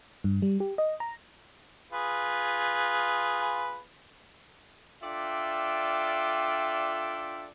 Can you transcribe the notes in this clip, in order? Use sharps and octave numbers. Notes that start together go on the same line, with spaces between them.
G2
G3
G4
D#5
A#5
F4 G#4 B4
D4 F4 A4 D5 E5 G5